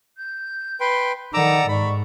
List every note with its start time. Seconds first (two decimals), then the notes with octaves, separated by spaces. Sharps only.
0.16 G6
0.80 B4 G5 C6
1.34 D#3 A4 D5 F#5 A#5 D6 E6
1.68 G#2 D5 A#5 B5 C#6